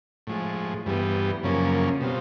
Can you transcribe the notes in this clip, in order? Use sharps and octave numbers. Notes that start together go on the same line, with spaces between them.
A2 F3 G#3
G2 E3 G3 B3
F#2 C#3 F3 A#3 C#4
B2 G3 C4 F4